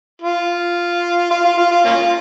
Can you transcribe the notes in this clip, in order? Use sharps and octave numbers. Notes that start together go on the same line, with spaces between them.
F4
F4
F4
F4
F4
A#3 C#4 F4